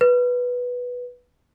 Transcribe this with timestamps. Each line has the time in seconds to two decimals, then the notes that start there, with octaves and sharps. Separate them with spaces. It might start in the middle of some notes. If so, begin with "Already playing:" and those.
0.01 B4